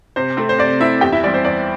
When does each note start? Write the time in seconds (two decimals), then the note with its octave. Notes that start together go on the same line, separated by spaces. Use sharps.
0.16 C3 C5
0.37 A3 C4
0.49 C5
0.59 C3 D5
0.80 A3 C4 E4 E5
1.01 E2 G4 G5
1.12 E4 E5
1.23 E3 G3 C4 D5
1.34 C5
1.45 E2 D5